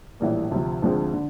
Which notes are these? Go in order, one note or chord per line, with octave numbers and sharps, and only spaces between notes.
A#1 A2 E3 G3 A#3
D2 C3 F3
D2 D3 F3 G#3 C4
D3